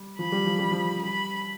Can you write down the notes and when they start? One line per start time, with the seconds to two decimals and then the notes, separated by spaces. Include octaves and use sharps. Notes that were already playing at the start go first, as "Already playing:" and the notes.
Already playing: G3
0.19 F3 B5
0.32 G3
0.46 F3
0.59 G3
0.71 F3
1.02 G3 B5